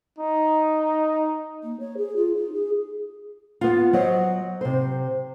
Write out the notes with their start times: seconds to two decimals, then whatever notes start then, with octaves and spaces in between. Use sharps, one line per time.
0.18 D#4
1.63 A#3
1.79 C#5
1.97 G#4
2.16 F4
2.35 D#4
2.52 G#4
3.61 B3 F4
3.93 F#3 C5 D#5
4.61 C3 C5